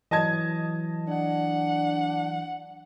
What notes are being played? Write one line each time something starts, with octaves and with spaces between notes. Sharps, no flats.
E3 F#3 D#5 A5 G#6
D4 F#5